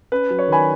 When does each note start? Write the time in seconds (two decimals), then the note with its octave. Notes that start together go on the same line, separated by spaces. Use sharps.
0.12 C#4 B4
0.30 F#3
0.39 C#5
0.48 D#3 G#5 B5